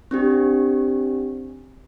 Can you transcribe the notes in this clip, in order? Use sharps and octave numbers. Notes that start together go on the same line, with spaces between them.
C4 D4 G4